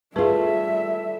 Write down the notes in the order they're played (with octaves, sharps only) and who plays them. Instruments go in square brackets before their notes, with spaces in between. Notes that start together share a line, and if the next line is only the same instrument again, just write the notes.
[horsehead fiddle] G3 E5 [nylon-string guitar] A3 F4 [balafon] G#4 B4 [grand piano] A4